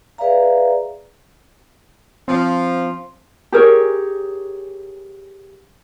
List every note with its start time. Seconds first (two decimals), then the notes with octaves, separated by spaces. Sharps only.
0.18 G#4 B4 D5 E5 F5 A#5
2.28 F3 C4
3.52 G4 G#4 A#4 C#5